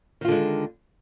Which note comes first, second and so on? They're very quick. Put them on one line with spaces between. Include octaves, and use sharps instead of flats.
D#3 F4 D3 G#3